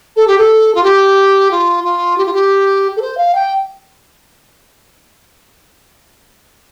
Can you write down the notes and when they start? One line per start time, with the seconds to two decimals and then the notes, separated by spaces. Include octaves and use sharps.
0.16 A4
0.27 G4
0.38 A4
0.74 F4
0.83 G4
1.51 F4
1.84 F4
2.17 G4
2.25 F4
2.33 G4
2.96 A4
3.01 C5
3.17 F5
3.34 G5